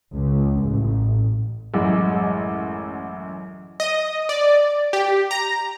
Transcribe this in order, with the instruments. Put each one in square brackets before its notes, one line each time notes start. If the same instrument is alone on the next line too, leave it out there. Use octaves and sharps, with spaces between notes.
[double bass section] C#2
A1
[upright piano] A1 F#2 G#3
[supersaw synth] D#5
D5
G4
A#5